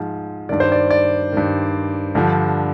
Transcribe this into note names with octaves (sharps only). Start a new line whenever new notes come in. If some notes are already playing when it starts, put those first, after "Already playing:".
Already playing: G#2 F3
G2 D#3 D5
C5
D5
D5
G2 D#3
G2 D3 F3